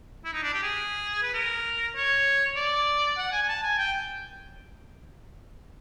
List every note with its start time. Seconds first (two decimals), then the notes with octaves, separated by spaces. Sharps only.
0.25 E4
0.33 D#4
0.43 D4
0.53 G4
0.63 G#4
1.23 B4
1.34 A#4
1.96 C#5
2.56 D5
3.18 F#5
3.32 G#5
3.43 G#5
3.48 A5
3.63 G#5
3.78 G5